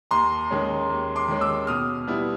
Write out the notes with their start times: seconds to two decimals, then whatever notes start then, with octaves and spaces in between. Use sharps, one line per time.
0.11 D#2 A#5 C6
0.51 D#3 G#3 C#4
0.90 D#2
1.16 C6 D6
1.28 D#3 G#3 C#4
1.41 D6 E6
1.67 B2 D#6 F6
2.07 G3 B3 E4